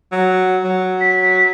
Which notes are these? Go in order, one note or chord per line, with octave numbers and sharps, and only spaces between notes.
F#3
F#3
B6